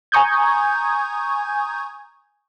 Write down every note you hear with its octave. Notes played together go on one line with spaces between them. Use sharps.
G#5 A#5 C#6 D#6 G6 G#6